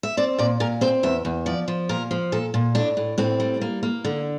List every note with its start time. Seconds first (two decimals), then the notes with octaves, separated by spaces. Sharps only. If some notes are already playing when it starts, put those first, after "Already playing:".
0.03 E5
0.17 C4 D5
0.38 A#2 D5
0.60 A#2 A#4
0.81 C4 C5
1.03 E2 E5
1.25 E2
1.46 F3 D5
1.68 F3
1.89 A#2 A#4
2.11 F3
2.32 A#2 A4
2.54 A#2
2.75 A2 D4
2.97 A2
3.18 A2 C4
3.40 G3
3.61 A#3
3.83 A#3
4.04 D3